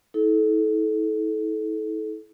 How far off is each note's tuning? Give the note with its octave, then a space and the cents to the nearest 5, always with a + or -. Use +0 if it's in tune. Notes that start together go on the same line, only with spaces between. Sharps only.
E4 -40 A4 -25